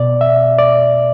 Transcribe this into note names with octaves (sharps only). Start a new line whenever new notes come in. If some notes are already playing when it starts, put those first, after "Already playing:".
Already playing: B2 D5
E5
D5